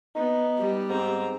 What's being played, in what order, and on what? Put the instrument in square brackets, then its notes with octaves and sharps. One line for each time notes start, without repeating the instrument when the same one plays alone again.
[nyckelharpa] B3 [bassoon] D#4
[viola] G3
[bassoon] G#2 [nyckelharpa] C4 A#5